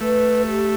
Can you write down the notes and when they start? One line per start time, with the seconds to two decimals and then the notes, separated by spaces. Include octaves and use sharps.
0.01 A3 B4
0.48 G4